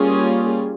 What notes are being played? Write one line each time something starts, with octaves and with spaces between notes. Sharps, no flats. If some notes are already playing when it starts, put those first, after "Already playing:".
Already playing: G3 A#3 C#4 F4 G#4